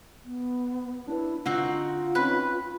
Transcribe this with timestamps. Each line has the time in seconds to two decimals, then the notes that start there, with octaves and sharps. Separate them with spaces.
0.24 B3
1.07 D4 E4 B4
1.46 D3 C4 D#4 F4 F#4
2.15 C4 C#4 D#4 B4 F#6